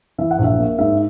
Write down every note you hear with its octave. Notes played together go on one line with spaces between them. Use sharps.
E3 E5
F#5
A#1
E5
A#3
G#2 E5